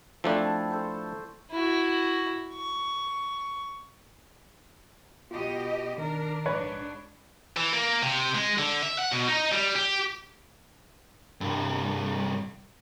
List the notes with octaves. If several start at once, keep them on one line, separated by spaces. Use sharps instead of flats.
F3 A3 C4 D4 E4 A5
A4 C5 C#6
E4 F#4
C#6
B2 F4 G4 D#5
D#3 D4 A#4
A#1 G#2 D4 B4 C#5
E3
A#3
C3
G#3
D3
E5
F#5
B2
D#4
G3
G4
C2 G2